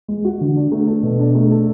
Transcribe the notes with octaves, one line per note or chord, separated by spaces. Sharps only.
G#3
F#4
D3
D4
A3
A4
B2
D4
A3
A4